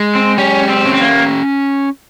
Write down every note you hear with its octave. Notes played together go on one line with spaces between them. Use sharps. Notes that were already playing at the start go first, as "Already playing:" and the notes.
Already playing: G#3
C4
C#4 G4
C4
C#4
C4
A#3